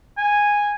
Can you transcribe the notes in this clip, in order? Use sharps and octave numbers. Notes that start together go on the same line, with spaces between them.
G#5